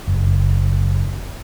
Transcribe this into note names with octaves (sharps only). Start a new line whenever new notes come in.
F#1